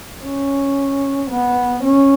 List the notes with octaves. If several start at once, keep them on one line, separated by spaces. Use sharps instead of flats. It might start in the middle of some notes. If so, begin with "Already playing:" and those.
C#4
B3
C#4